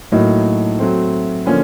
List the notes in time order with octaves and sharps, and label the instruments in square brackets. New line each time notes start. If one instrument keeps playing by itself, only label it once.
[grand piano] A2 F#3 A#3 D#4
F#3 A3 C4
D3 F3 A#3 C#4